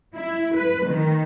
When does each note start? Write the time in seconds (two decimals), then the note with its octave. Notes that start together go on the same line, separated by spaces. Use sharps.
0.14 E4
0.55 B4
0.87 D#3